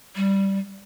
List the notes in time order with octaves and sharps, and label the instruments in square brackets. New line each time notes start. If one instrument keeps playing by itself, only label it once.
[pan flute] G3